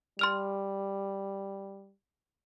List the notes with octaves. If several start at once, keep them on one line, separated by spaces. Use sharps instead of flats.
G3 C6 F6 F7